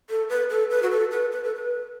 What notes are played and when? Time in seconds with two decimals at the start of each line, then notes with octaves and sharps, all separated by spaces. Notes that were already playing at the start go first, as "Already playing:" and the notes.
0.10 A4
0.29 B4
0.50 A4
0.71 B4
0.83 F#4
0.91 A4
1.11 B4
1.32 B4
1.44 A4
1.55 B4